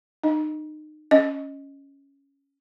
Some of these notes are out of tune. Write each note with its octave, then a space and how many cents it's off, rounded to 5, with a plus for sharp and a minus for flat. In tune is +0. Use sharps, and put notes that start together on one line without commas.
D#4 -30 D#5 +0
C#4 +0 D#5 +0